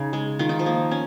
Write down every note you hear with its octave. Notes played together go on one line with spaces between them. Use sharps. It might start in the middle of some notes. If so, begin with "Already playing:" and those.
Already playing: C#3 D#4
G#3
D#3 F4
D#4
F3 F4
A#3
C#4